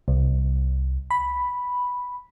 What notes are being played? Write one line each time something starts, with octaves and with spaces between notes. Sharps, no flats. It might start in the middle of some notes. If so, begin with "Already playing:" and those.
C2
B5